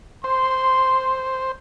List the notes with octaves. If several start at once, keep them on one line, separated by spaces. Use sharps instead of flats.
C5 C6